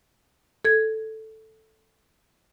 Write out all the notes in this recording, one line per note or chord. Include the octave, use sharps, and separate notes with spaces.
A4 G#6